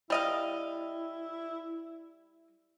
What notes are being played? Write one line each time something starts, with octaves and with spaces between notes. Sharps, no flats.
G3 E4 D#5 F5